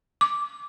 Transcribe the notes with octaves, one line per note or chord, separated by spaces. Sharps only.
D6